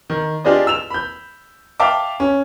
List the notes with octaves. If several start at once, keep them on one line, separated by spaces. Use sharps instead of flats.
D#3
D4 F4 G4 G#4 D5 D#5
E6 E7 F7
B5 G6
E5 F5 G5 A5 D6
C#4